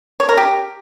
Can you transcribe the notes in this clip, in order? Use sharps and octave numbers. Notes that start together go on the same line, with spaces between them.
C#5
A#4
G4